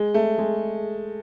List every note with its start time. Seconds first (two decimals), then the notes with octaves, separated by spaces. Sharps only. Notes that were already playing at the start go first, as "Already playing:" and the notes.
Already playing: G#3
0.14 A3
0.38 G#3